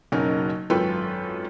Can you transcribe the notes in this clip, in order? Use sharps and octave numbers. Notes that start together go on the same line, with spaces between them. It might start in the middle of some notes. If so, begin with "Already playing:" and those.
F#1 B2 C#4 D#4 A#4
G#1 F#2 F4 A4 B4 G5